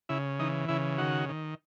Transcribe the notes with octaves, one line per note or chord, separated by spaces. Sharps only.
C#3 E4
E3 D#4
C#3 E4
D#3 F#4
D#3